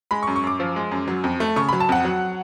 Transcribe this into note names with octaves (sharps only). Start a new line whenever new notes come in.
G#3 B5
C#6
F#2
C#6
F#2 D6
F3
G#3
F#2
F#3
F2
A3
C#3 C#6
B5
F#3
A5
F2 F#5
F#3